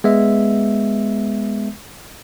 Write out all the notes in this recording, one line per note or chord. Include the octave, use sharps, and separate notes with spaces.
G#3 B3 E5